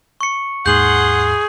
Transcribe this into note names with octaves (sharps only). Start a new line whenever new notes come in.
C#6 C#7
D#2 G#2 G#4 F#5 C6 G6 F#7